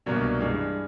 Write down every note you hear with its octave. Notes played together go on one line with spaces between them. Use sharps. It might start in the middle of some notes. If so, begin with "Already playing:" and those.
C2 B2 F#3 A#3 D4
G2 E3 G#3